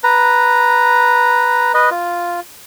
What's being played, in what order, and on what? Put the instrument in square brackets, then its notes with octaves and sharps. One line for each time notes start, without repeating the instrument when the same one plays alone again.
[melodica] B4 A#5
B4 D#5
F4